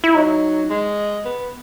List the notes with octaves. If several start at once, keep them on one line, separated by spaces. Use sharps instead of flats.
E4
F#3 D#4
G#3
B3